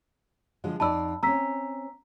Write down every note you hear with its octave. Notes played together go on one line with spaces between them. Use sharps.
D3 F3 G#3
F2 D#4 D5 A5 B5 E6
C4 C#4 A#5 E6 B6